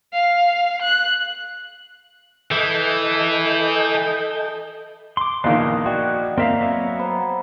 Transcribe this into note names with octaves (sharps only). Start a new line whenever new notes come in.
F5
F#6
E3 A4 D#5 G6
C6 D6
A#1 A#2 D#3 E3 B3 F5
F#4 D5 D#5 G5
A#3 C4 E5 F5
F#3 B3 E5
C5 A#5 B5